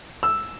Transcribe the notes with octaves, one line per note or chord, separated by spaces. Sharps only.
E6